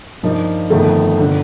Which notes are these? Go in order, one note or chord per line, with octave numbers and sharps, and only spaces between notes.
G2 F3 A#3 D#4
G1 F2 D#3 A3
G1 D3